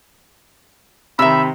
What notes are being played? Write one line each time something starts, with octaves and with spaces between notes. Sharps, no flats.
C3 D#3 E5 B5 E6